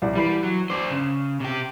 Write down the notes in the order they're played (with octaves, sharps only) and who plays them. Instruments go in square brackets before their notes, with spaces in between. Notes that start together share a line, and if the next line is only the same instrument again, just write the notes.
[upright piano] C2 D5
[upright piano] E3 B5 C7 [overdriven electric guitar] G3
[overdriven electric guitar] F#3
[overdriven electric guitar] D4 C5 [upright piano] D6
[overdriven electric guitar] C#3 [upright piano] E7
[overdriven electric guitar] C3 G4